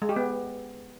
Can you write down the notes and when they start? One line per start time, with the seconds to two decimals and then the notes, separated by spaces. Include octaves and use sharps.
0.02 G#3
0.09 G4
0.16 B3